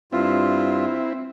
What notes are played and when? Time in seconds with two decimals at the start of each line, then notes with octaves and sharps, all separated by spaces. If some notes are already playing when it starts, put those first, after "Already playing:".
0.12 G2 C4 E4 F4